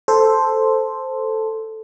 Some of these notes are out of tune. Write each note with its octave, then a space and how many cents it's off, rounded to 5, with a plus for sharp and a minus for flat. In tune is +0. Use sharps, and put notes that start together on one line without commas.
A4 +0 C5 +0